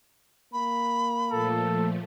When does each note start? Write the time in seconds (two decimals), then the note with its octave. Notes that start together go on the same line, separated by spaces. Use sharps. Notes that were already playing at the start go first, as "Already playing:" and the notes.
0.53 A#3 B5
1.31 A#2 F3 A3 A4